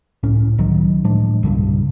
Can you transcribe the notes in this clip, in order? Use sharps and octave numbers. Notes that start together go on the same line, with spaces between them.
C#2 A2 C#4
C#2 D#3 F#3
A2 F3 G#3 D4
C2 G2 A#2 C#3